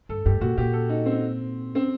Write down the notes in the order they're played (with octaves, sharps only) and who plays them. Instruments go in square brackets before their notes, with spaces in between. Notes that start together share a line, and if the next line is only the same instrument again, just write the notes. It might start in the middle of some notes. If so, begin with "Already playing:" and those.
[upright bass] G2 [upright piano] A4
[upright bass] G2 [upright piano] G4
[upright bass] A#2 [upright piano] F#4
[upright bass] A#2 [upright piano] G4
[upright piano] A4
D#4
C4
C4